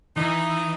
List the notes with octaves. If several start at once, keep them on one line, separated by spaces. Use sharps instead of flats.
E3 D#4